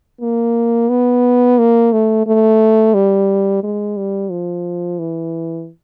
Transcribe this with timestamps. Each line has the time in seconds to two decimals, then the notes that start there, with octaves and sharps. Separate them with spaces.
0.21 A#3
0.90 B3
1.59 A#3
1.93 A3
2.27 A3
2.94 G3
3.63 G#3
3.97 G3
4.31 F3
4.99 E3